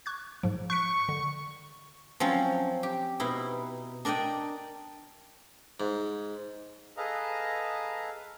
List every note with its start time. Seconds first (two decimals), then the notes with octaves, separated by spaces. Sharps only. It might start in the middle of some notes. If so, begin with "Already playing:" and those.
0.06 C#6 F#6 G#6
0.43 G#2 F3
0.70 C#6 F#6 B6 C#7
1.09 D3
2.20 F3 F#3 C4 C#4
2.83 G4
3.20 B2 D#4 E4
4.05 D4 A#4 D5 D#5 G5
5.80 G#2
6.97 G#4 A4 B4 D#5 F5 A#5